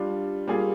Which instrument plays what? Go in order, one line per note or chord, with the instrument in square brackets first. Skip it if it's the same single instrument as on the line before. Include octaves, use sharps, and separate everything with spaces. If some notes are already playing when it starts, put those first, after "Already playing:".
Already playing: [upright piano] G3 D4 F4
G3 A#3 F4 G#4